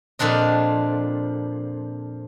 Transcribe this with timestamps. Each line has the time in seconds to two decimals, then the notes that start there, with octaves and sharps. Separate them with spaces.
0.19 F2 A#2 C4 D4 D#5